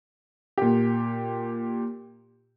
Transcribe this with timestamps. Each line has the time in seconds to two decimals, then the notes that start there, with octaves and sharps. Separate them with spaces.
0.58 A#2 G4